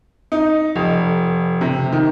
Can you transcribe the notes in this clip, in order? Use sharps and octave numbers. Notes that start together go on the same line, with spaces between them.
D#4
F1
C3
D#3